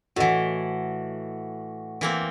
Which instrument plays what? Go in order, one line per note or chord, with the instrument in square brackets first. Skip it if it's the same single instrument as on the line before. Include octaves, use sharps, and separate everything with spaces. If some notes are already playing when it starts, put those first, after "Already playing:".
[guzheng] A2 E3 [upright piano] F#4 D#5 F#5
[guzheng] E3 A#3 C4